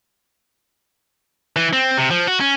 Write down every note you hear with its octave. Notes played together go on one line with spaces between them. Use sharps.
E3
C4
C3
F3
F#4
C#4